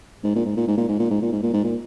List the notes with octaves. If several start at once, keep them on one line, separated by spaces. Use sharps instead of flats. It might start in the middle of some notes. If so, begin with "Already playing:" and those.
G#2
A#2
G#2
A#2
G#2
A#2
G#2
A#2
G#2
A#2
G#2
A#2
G#2
A#2